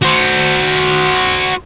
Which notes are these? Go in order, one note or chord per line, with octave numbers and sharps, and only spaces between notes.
F#4 C5